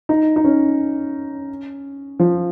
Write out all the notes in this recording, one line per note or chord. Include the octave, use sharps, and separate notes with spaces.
D#4
D#4
C#4
F3